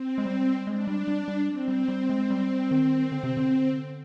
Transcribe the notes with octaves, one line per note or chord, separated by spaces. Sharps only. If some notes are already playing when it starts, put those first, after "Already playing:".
Already playing: C4
G#3
G3
G#3 D4
G3
G3
G3
C4
G3
G3
G#3
G3
D#3
D3
C3
D3